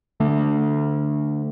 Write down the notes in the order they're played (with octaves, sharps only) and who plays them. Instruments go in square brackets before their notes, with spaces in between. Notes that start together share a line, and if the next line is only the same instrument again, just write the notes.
[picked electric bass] D3 A3 D4